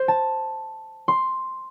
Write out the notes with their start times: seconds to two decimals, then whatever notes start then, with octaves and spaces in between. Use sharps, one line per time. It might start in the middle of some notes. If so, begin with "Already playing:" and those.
Already playing: C5
0.08 A5
1.08 C6